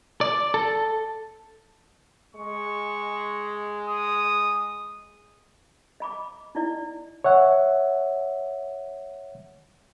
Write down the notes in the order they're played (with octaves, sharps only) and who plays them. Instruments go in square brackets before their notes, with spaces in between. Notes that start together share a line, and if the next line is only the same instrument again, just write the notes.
[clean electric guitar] D5
A4
[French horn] G#3 [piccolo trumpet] C#6
[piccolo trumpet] D#6
[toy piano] D#5 B5 D6
D#4 E4 D5 D#5
[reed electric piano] C#5 E5 F#5